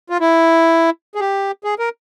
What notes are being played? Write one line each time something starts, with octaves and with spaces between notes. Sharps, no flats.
F4
E4
G#4
G4
G#4
A#4